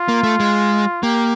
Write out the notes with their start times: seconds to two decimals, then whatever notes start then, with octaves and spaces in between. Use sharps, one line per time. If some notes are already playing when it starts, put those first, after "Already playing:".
Already playing: F4
0.08 A#3
0.23 A3
0.40 G#3
1.03 A#3 G4